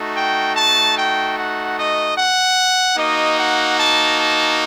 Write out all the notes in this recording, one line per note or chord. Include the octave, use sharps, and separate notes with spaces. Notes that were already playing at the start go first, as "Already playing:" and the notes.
Already playing: A3 D#4 F#4
G5
A5
G5
F#5
D#5
F#5
A#3 D#4 F#4 D#5
F#5
A5
A5